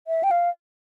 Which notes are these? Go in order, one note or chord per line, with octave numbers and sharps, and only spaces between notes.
E5
G5
F5